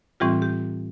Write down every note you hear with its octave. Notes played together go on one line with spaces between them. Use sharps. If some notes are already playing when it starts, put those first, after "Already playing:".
A2 E3 G3 C4 F4 G4
G4